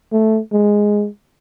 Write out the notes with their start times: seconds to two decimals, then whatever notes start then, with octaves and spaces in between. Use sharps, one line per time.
0.12 A3
0.53 G#3